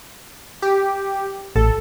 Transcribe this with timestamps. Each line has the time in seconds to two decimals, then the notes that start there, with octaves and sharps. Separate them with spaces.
0.62 G4
1.56 A1 A4